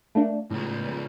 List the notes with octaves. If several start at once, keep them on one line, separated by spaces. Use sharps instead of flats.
A3 A#3 D4
C#2 A2 F3